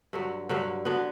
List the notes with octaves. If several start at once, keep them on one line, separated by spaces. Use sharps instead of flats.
G2 D3 F#3
G2 D3 F#3
D3 F#3 B3